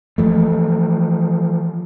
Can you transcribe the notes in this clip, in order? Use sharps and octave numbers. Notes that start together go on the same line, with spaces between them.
E3 F3 A3